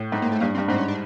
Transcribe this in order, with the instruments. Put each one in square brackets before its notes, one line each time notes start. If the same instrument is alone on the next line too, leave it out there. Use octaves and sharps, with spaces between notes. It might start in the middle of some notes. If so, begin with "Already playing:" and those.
Already playing: [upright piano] A2
[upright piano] G#2 [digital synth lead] A3
[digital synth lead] A#3
A3
[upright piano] G2 [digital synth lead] A#3
[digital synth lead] C4
[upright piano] G2
[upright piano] G#2 [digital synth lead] C4
[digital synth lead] C#4
D4